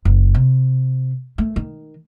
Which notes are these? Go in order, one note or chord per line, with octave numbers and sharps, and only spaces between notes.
F#1
C3
A3
D#3